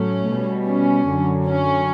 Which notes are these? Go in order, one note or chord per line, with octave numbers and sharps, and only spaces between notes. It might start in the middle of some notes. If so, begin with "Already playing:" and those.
Already playing: A2 F#3 A3 C#4
B2 G3
C#4
F#2 D3 F#3
C#4